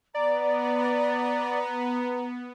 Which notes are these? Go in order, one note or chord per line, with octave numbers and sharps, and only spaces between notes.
B3 D5 A#5